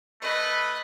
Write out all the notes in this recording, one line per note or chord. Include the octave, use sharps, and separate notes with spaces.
A3 B4 D#5 B5